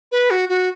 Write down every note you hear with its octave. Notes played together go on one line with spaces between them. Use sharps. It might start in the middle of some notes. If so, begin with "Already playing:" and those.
B4
F#4
F#4